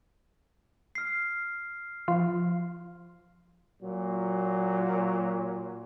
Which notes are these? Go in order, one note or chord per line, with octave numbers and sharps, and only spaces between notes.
F6 C7
F3
A#2 F#3